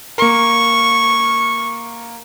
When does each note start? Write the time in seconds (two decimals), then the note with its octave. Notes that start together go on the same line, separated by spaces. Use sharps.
0.18 A#3 A#4 C#6